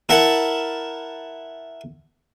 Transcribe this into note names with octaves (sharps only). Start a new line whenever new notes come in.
E4 A#4 E5 F#5 A5